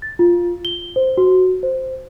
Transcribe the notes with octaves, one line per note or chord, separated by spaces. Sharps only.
A6
F4
G7
C5
F#4
C5